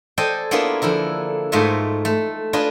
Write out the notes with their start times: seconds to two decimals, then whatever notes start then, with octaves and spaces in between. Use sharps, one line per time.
0.18 A4 C5 D5 D#5 G5 G#5
0.51 A#3 B3 D4 E4 F4 G#4
0.82 D3 F3 E4 A#4
1.52 G#2 A3 F4 D#5 E5
2.05 A3
2.53 D4 F4 G#4 B4 D#5